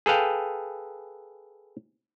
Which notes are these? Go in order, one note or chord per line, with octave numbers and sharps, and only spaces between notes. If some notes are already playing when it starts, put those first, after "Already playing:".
G#4 A4 B4 F5 G5